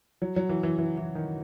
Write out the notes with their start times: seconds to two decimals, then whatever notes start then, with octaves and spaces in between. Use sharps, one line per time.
0.22 F#3
0.36 F#3
0.49 E3
0.63 E3
0.78 E3
0.97 E3
1.15 D#3